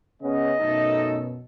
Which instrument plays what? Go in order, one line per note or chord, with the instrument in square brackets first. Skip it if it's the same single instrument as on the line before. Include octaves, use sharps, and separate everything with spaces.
[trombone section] C#3 B3 C#4 [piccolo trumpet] D#5
[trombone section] F#2 B2 [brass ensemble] A3 D#4 A4